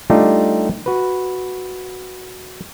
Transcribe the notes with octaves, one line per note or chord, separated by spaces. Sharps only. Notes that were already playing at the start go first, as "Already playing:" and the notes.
G3 A3 D4 D#4 F4 G4
F#4 B4